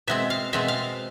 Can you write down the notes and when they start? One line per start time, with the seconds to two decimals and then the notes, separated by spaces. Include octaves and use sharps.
0.07 B2 G#3 C4 E5
0.30 F5
0.53 B2 G#3 C4 E5
0.68 F5